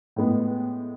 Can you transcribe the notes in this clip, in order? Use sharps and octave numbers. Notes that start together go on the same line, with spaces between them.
A2 G#3 B3